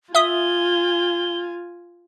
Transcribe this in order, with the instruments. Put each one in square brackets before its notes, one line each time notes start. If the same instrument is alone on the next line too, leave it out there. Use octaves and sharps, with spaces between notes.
[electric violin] F4 G#5 [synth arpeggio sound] E5 D#6 [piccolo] G7